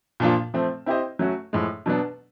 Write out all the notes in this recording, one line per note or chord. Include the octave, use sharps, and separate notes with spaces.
A#2 F3 A#3 D4 F4
F3 A3 C4
C4 E4 G4 C5 D#5
F#3 A3 C#4 F#4
A2 F3 G#3
B2 F#3 B3 D4